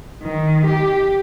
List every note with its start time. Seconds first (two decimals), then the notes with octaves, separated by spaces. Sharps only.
0.23 D#3
0.67 G4